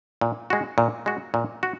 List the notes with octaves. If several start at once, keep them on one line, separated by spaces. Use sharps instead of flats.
A#2
G#3 F#4
A#2
G#3 F#4
A#2
F#4